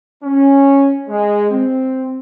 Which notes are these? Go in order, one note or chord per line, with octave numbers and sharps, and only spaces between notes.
C#4
G#3
C4